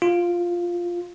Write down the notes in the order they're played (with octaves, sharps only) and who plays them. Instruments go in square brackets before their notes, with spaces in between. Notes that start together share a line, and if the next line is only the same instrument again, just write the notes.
[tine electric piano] F4